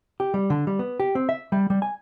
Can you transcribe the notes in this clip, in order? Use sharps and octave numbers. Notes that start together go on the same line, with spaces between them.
G4
G3
D3
G3
B3
G4
C4
E5
G3
G3
G#5